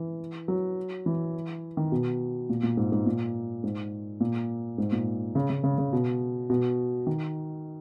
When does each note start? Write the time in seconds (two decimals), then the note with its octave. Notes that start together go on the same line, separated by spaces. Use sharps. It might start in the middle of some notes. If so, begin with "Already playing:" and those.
Already playing: E3
0.48 F#3
1.06 E3
1.77 D#3
1.92 B2
2.49 A#2
2.63 A#2
2.77 G#2
2.92 G#2
3.06 A#2
3.63 G#2
4.20 A#2
4.78 G#2
4.92 A#2
5.35 C#3
5.50 C#3
5.64 C#3
5.78 C#3
5.93 B2
6.50 B2
7.07 D#3